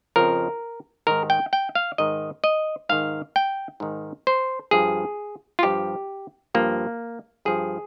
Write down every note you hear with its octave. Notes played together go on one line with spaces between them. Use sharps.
F2 C#3 F3 A#4
G#2 D#3 A#4
G5
G5
F5
G#2 D#3 D#5
D#5
G#2 D#3 F5
G5
G#2 D#3
C5
G2 F3 G#4
F4
G2 F3 G4
G2 F3 A#3
G2 F3 G#4